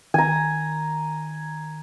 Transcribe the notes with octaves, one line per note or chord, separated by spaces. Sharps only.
D#3 G#5 A#5